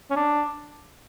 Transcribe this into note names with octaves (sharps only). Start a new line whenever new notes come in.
C#4
D4